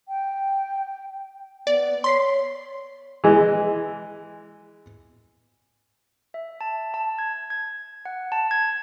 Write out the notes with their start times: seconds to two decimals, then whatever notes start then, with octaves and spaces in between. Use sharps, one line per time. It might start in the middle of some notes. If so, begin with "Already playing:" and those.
0.08 G5
1.67 B3 D5
2.04 C#5 C6 B6 C7
3.24 E3 G#3
6.34 E5
6.61 A5
6.94 A5
7.19 G#6
7.50 G#6
8.05 F#5
8.32 A5
8.51 G#6